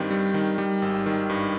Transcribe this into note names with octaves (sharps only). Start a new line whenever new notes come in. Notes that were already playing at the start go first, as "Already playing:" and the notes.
Already playing: G2 D#3 G3 C4
G3
D#3
G3
G#1
D#3
G2